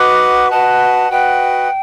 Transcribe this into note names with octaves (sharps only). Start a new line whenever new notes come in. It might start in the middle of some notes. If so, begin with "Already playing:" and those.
Already playing: F#4 B4 D#5 F#5 D6
F#4 B4 D#5 F#5 A5
F#4 B4 D#5 F#5 G5